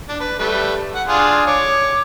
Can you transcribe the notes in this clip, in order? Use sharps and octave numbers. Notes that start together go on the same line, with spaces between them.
D4
B4
G3 A3 B4
F#5
D4 F4 G#4
C#5 D6